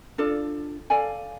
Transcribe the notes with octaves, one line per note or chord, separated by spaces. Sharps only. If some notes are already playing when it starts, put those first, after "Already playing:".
D4 F4 A4 D5
A4 D5 F5 G#5